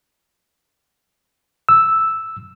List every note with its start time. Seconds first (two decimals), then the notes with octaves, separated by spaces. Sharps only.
1.69 E6